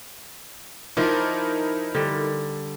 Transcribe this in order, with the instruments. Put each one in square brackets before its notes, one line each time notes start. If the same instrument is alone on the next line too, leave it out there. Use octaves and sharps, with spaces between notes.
[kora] F3 D5 [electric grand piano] D#4 E4 A#4
[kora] D3 G3